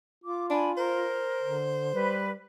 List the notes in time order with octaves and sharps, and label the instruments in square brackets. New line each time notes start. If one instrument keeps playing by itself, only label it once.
[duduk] F4 [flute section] D6
[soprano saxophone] D4 [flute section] G#5 B5
[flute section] A#4 [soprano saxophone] C5
[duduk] D3
[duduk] G3 [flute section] B4